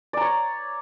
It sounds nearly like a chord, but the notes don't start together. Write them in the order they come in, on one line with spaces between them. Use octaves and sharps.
D5 A#5 C#5